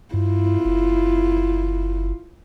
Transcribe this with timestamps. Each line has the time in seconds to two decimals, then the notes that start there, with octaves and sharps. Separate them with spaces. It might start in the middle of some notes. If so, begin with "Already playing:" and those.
0.14 G2 E4 F4
0.65 F#1